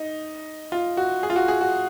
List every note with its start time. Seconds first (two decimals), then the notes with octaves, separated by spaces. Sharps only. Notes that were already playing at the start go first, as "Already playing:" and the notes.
Already playing: D#4
0.72 F4
0.97 F#4
1.23 G#4
1.30 F4
1.36 F#4
1.48 G#4
1.61 F#4